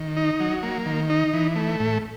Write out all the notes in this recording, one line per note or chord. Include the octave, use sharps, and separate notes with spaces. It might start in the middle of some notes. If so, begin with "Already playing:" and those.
Already playing: D#3
D#4
F#3
A#3
D#3
D#4
E3
A3
A2